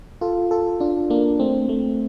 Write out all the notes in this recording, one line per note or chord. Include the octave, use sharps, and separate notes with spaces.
F4 A4
F4 A4
D4 F4
A#3 D4
A3 C4
A3